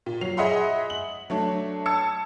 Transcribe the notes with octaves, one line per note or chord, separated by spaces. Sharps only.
A#2
F#3 C7 F7
G#4 D#5 E5 F#5 B5 C6
F#7
F#3 A3 D4
A5 E6 G#6 C#7